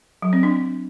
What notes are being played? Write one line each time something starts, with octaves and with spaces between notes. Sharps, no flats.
F#3
C4
D4